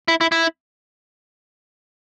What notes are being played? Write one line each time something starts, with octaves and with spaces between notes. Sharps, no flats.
E4
E4
E4